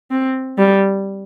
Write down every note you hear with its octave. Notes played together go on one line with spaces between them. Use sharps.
C4
G3